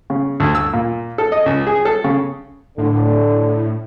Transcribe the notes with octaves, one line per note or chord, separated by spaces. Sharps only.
C#3
D2
E6
A#2
A4
D#5
C#2
G#4
A4
C#3
A2 D3